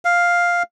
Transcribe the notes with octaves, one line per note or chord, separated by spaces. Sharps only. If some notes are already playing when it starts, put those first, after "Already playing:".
F5